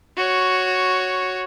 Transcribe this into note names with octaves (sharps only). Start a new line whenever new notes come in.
F#4 C#5